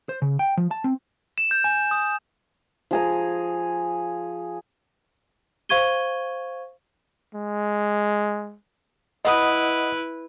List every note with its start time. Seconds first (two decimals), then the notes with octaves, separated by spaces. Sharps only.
0.09 C5
0.22 C#3
0.39 G5
0.57 F3
0.71 A5
0.84 C4
1.38 E7
1.51 G6
1.64 G#5
1.91 D#6
2.91 F3 G#4 A#5
5.69 C5 F5 C#6 G#6 D#7 G7
7.35 G#3
9.25 E4 B4 D#5 F#5 D#6